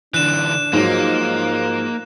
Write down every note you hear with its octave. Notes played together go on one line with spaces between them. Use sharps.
D3 E3 D4 F#6 E7
G#2 F3 F#3 A#3